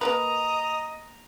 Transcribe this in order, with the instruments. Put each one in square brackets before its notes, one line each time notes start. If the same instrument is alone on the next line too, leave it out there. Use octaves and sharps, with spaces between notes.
[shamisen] A#3 A#4 B4 [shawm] D#5 [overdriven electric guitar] A#5